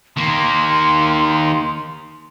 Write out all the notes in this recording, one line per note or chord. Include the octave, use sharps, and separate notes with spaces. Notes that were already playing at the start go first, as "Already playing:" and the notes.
D#3 A#3 C6